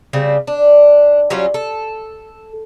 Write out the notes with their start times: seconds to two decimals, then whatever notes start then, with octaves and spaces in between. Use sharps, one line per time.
0.13 C#3 G3 C4
0.47 D4
1.30 F#3 G3 C#4 F4
1.54 A4